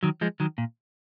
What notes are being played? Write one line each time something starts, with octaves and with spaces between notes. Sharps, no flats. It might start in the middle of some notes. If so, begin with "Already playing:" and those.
D#3 F#3
F3 G#3
D#3 F#3
A#2